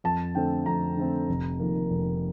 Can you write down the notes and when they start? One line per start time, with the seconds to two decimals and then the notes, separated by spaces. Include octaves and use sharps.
0.04 F2 A5
0.35 D3 A3 C4 G5
0.66 F2 A#5
0.97 D3 A3 C4
1.29 F1
1.60 F2 D#3 A#3
1.90 F1